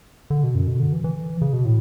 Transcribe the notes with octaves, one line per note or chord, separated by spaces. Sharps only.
D3
B2
F#2
B2
D3
E3
E3
C#3
B2
A2